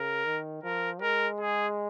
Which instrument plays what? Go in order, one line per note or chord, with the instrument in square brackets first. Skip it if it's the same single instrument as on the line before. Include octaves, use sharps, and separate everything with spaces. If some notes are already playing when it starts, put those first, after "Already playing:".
Already playing: [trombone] C#3 [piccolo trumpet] A#4
[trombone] D#3
[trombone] F3 [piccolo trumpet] A#4
[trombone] G#3 [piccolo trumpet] A#4
[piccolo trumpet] G#4